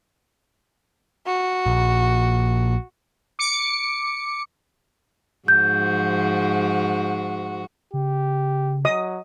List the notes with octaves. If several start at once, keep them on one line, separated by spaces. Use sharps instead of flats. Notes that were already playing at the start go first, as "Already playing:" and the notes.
F#4
A#1
D6 C#7
G#2 F3 F#4 G6
C#3 G4
F#3 D#5 D#6